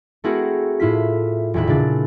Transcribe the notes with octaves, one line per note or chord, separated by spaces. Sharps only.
A3 C4 E4 F#4 G#4 A#4
A2 E4 F4 B6
D#1 E2 E4 B4
A#2 C#3 D4 A6